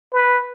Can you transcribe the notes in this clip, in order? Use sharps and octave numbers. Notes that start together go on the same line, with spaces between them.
B4